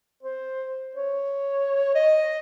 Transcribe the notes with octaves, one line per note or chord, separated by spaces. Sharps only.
C5
C#5
D#5